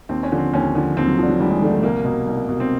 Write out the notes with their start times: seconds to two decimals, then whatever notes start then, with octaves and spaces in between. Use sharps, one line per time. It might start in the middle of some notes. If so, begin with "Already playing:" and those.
0.09 D#2 C4
0.23 C#4
0.32 D3 F3
0.37 C4
0.53 D#2 C#4
0.75 D3 F3
0.97 D#2 C4
1.08 F#3
1.18 F3
1.23 D3
1.29 F#3
1.40 D#2 G3
1.51 G#3
1.62 D3 F3 A3
1.72 A3
1.83 C2 A#3
2.05 B2
2.27 C2
2.49 B2
2.60 C4